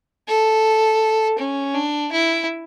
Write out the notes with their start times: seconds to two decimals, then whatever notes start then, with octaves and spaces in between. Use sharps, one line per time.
0.28 A4
1.39 C#4
1.75 D4
2.12 E4